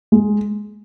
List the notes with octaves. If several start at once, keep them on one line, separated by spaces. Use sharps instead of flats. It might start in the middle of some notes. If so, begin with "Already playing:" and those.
G#3